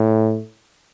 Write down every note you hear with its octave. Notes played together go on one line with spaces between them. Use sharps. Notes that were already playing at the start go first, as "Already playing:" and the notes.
Already playing: A2